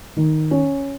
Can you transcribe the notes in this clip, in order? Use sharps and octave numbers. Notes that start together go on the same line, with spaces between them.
D#3
C#4